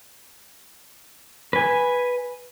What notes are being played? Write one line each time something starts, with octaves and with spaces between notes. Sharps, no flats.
B4 G#5